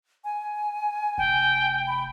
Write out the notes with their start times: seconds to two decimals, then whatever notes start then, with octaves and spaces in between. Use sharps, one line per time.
0.24 G#5
1.18 F1 G5
1.87 B5